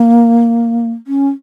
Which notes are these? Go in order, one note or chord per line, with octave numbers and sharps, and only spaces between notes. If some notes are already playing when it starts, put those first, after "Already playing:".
Already playing: A#3
C#4